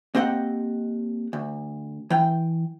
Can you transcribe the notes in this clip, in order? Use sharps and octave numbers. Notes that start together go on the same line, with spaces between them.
A#3 C4 G4 D#5 F#5
D2
E3 G5